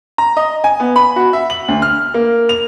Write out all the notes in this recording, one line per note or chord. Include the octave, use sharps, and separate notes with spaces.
A#5
D#5
G#5
B3
B5
F#4
E5
F#7
D2
F6
A#3
F7